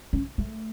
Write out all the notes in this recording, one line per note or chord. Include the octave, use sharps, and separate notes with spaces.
C#4
A3